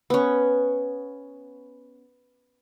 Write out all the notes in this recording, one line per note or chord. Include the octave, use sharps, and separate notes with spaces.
B3 C#4